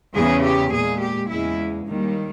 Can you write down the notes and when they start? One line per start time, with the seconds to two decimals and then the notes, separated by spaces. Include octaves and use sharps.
0.14 E2 C#3 E3 G#4
0.43 G4
0.72 A#2 G#3 G#4
1.01 G4
1.29 E2 C#3 G#3 E4
1.87 D#2 D#3 G3 A#3